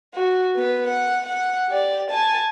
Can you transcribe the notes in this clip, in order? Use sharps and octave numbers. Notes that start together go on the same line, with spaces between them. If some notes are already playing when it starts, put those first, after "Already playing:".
F#4
B3 B4
F#5
F#5
G4 D5
G#5 A5